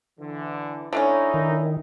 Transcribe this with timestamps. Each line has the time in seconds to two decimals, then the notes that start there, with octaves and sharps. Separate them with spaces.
0.20 D3 E3
0.93 D3 A3 C#4 D#4 E4
1.34 D#3